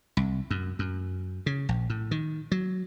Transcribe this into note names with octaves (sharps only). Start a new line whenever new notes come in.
C2
F#2
F#2
C#3
A#1
A2
D#3
F#3